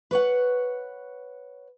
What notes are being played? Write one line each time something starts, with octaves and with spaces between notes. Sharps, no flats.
B4 C#5 F#5